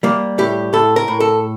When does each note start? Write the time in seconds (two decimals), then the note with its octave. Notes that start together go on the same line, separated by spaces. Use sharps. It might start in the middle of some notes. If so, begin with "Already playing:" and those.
0.03 G3 A#3
0.38 A2 G4
0.73 A2 A4
0.96 A#4
1.08 A2
1.20 A4